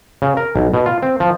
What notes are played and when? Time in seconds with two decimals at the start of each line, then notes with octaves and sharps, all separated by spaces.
0.22 C#3
0.37 A#4
0.56 B1
0.74 B2
0.86 F4
1.03 C4
1.20 F3